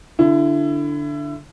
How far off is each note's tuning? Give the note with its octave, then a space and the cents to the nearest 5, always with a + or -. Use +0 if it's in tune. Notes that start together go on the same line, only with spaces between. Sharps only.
D3 +0 E4 +25